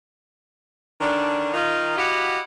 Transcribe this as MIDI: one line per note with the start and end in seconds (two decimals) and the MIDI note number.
1.01 1.51 50
1.01 1.51 51
1.01 1.51 61
1.01 1.51 62
1.54 1.93 51
1.54 1.93 63
1.54 1.93 65
1.96 2.39 64
1.96 2.39 66
1.96 2.39 67
1.96 2.39 75
1.96 2.39 77
1.96 2.39 78